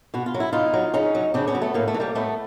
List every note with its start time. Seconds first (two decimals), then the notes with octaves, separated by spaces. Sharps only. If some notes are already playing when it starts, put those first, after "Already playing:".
0.14 B2 F#4
0.26 F4
0.34 F#3
0.40 E4
0.53 B2 D#4 F4
0.74 F#3
0.94 C#3 C#4 D#4
1.15 F#3
1.34 C#3 C4 D4
1.47 B3 C#4
1.55 F#3
1.62 A3 B3
1.74 A2 A#3
1.88 A3
1.94 E3
2.00 G3 A#3
2.15 A2 A3 B3